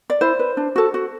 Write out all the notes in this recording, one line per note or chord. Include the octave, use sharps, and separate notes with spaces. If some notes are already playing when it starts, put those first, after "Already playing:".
D5
E4 C5
B4
D4
F#4 A4
F#4